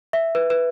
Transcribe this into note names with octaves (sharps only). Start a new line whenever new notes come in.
E5
B4
B4